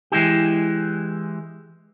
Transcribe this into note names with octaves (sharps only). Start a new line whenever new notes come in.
E3 G#3 E4 G4